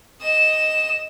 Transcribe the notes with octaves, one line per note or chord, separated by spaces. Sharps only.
D#5 E7